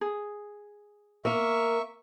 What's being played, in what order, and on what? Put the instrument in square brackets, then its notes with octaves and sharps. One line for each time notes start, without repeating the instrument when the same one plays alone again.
[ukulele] G#4
[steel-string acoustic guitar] A#3 A#4 [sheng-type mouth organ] E5 C#6